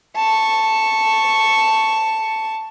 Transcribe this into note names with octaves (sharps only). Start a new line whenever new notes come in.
A5 C#6